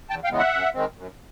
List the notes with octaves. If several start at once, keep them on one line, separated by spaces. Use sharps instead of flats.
E2 G5 A5
F5 G5
C#3 E3 G#3 B3
E5 F#5
F#2
D#3 G#3 C4
F#2